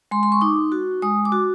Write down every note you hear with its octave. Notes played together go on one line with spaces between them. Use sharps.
G#3 C6
C6
C#6
D#4 D6
F#4
G#3 D#6
D6
F#4